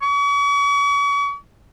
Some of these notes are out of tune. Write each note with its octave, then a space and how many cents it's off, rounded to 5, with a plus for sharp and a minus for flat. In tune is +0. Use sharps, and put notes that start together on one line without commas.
C#6 +40